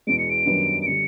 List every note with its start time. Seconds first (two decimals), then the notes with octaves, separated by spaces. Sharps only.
0.07 E2 B2 G#3 D7
0.18 C#7
0.30 D7
0.46 F#2 D#3 G3 B3 D4
0.82 D7
0.86 D3 G3 C#7